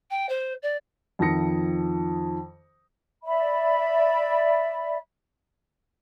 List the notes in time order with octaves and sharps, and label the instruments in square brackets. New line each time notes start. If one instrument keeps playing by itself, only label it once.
[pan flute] G5
C5
D5
[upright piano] F2 D#3 F3 D#6 A#6 C#7
[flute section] D5 E5 B5